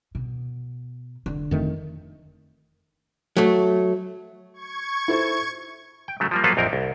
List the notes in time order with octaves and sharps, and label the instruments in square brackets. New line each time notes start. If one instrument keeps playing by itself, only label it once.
[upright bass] B2
[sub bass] F1 [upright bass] D3
[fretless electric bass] F2 D#3 A3
[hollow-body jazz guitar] F#3 A3
[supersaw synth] C#6 G#6
[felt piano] E4 A4 C5
[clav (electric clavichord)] G5
C#3 F#3 A3
F3 G3 A#3
F3 F#3 A#3 F4 A4 B4
A#1 F2 C4 A#4
C2